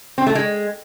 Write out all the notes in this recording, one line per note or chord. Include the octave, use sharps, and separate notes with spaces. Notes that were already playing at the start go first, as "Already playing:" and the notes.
C4
A3
G#3